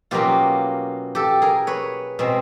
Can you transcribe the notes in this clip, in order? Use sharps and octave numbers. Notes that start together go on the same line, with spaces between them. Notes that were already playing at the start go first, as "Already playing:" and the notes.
B2 F#3 A#3 C#4 F4 G4
G4 A4
G#4 A#4
B4 C#5
B2 G#3 C4